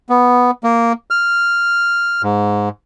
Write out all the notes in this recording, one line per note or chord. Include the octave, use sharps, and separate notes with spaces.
B3
A#3
F6
G#2